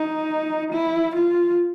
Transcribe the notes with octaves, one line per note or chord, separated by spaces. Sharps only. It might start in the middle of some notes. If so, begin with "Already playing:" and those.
Already playing: D#4
E4
F4